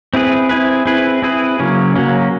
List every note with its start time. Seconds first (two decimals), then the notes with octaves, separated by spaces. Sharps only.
0.14 C4 E4 G#4 B4
0.49 C4 E4 G#4 B4
0.86 C4 E4 G#4 B4
1.22 C4 E4 G#4 B4
1.59 C#3 F#3 A#3 C#4
1.96 C#3 F#3 A#3 C#4